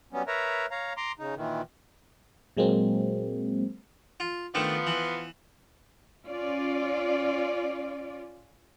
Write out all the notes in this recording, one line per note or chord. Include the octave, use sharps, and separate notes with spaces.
F#3 G3 B3 C#4
A#4 B4 C#5 E5 A#5
C#5 F5 A#5
A#5 C6 D6
C#3 D#4
A#2 D#3 E3
A#2 F#3 G#3 A#3 C4
F4
D#3 F3 A3 B3 D4
E3
C#4 F4 D5